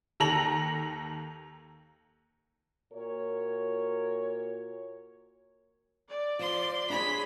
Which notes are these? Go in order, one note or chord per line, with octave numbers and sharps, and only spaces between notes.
D#2 A4 A#5 A#6 F7 F#7
A#2 F#4 A#4 C#5
D5
F3 C6
D4 G#4 C#5 B5